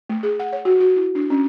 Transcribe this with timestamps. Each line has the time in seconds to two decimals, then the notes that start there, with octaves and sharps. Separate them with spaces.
0.10 A3
0.23 G#4
0.40 F#5
0.52 C#5
0.65 F#4
0.80 F#4
0.96 E4
1.15 D4
1.30 C#4